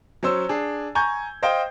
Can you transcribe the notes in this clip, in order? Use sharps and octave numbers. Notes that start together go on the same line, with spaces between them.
F#3 C#4 C5 E6
D4 G#4
G#5 A#5 C#6 G6 G#6
C5 D#5 F5 G5